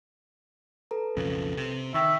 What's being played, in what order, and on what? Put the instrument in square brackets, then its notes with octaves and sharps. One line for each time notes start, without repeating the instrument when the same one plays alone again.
[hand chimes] A4 B4 A#5
[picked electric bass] B1 F2 C#3
C3
[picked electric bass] D#3 [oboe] E5 [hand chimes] G5 C#6